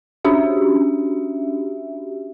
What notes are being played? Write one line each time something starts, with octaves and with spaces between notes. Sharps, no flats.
C#4 D4 F#4 G4 E5